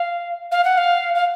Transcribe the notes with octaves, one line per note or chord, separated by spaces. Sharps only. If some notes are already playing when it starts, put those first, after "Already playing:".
Already playing: F5
F5
F#5
F5
F5